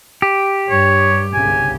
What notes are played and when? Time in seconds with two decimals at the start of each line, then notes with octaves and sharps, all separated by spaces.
0.22 G4
0.70 G2 C#5
1.34 G1 C2 C#3 G#5